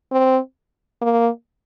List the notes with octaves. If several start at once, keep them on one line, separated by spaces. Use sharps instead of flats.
C4
A#3